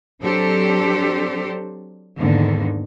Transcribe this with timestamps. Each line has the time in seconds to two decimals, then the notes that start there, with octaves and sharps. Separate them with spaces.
0.21 F#3 C4 D4 G4 A4 C5
2.18 E2 G#2 D3 D#3 A#3